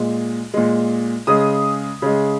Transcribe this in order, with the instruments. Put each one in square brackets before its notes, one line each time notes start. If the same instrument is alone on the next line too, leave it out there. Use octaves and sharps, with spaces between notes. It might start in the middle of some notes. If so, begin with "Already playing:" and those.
Already playing: [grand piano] A#2 G#3
A#2 G#3
C#3 G#3 D#6
C#3 G#3